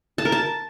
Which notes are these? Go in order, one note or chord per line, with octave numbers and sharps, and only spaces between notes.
A5
A#4
A5